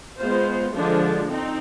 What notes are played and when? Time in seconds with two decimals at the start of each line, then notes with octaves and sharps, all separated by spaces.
0.18 G#3 B3 F4 C5
0.74 D3 F3 G#3 D4
1.29 C4 D#4